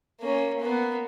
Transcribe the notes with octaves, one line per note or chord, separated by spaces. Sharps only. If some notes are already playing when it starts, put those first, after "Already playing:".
A#3 C#4
A#3 B3